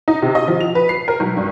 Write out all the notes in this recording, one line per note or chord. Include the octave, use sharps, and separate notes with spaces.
D#4
C3
D#5
F3
F7
B4
C7
A#4
B1
G2